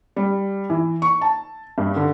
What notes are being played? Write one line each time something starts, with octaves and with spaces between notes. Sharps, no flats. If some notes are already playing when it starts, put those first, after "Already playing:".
G3
E3
C#6
A5
G2
D3